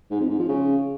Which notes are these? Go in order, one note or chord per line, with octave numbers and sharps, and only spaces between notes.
G#2
F2
G#2
F3
C#3